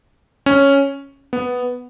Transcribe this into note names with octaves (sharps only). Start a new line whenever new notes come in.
C#4
B3